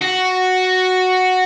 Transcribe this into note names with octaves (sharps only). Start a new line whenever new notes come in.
F#4